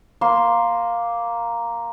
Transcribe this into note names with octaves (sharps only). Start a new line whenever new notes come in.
A#3 C6